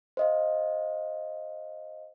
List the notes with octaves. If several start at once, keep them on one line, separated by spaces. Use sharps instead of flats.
C5 D#5 F5